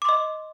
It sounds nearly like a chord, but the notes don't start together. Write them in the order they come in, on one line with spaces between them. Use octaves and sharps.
D6 C6 D#5